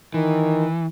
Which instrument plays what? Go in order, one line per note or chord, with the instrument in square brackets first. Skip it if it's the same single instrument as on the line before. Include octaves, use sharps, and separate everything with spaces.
[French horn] D#3 [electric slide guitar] E3